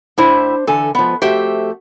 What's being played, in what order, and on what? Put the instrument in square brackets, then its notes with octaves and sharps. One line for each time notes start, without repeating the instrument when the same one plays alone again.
[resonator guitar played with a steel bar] A2 E4 [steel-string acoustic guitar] D4 C5
[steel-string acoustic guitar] D3 E3 G#5 [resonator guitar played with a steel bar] A4
[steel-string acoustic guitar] G#2 F3 [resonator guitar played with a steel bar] B3
[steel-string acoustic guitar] F2 A3 F#4 [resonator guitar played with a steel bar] G4 C5 E5